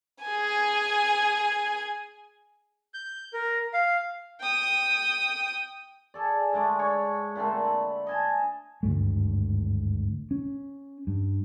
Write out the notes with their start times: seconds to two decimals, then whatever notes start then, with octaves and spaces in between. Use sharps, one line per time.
0.24 G#4 G#5
2.94 G6
3.34 A#4
3.73 F5
4.40 G5 D#6
6.14 G#4 A4 D5
6.53 D3 G#3 A3 D5
6.79 C#5
7.36 A#2 D3 A3 C4
7.64 B5
8.07 D#5 G#5 A5
8.83 G#1 D2 G2 A3
10.31 C#4
11.07 G2